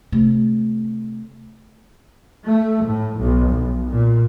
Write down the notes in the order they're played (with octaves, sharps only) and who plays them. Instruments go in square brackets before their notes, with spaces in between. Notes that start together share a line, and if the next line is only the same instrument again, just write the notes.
[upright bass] C3 A3
[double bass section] A3
A2
B1
B1
A#2